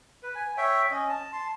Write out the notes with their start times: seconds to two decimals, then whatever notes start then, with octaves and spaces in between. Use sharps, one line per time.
0.23 B4
0.35 G#5
0.57 C#5 E5 G5
0.91 C#4 D#5
1.09 A5
1.33 A5 C6